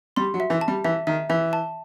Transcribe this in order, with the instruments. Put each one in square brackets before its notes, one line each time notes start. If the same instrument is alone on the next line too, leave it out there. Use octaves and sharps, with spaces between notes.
[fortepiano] G3 [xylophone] C6
[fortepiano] F#3
[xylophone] E5
[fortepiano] E3
[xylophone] A5
[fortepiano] G3
[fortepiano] E3 [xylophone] E5
[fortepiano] D#3 [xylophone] E5
[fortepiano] E3 [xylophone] E5
[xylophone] A5